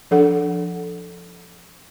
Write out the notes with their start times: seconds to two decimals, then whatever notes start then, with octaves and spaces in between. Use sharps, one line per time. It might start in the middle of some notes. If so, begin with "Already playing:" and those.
0.11 F3 D4 A4 F#5